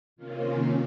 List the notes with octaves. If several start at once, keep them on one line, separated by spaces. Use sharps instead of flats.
C3 D#3 A#3 C#4 F4